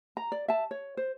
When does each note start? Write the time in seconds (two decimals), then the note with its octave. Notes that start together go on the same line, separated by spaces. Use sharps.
0.17 A#5
0.32 D5
0.48 E5 A5
0.71 C#5
0.97 C5